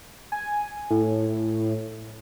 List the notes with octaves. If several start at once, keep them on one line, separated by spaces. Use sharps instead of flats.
G#5
A2